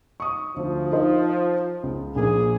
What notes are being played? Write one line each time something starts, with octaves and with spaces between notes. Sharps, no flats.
C#6 D#6
D2 F3
D#4 A#4 C5
C#2
A#1 A#3 G#4